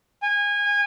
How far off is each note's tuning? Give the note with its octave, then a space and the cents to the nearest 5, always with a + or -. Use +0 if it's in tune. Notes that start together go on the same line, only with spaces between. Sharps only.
G#5 -25